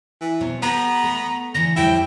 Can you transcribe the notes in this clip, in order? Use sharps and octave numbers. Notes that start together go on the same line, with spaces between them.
E3
B2 F#3 C4
B3 G4 A4 A#5
A3
D3 E3 A#6
F2 A2 G3 E4 G5